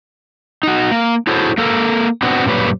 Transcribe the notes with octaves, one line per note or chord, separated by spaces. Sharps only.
D#4 F#4
A#3
E4 F#4 G#4 A4 C5 C#5
A#3 A4 A#4
B3 C4 D4 F#4
F#2 A#2 G3 B4 C#5